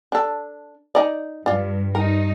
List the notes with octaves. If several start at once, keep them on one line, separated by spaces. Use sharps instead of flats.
D4 A4
D#4 D5
G2 D4 F4
G2 D#4 A#4